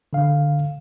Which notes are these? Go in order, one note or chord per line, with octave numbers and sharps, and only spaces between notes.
D3 F5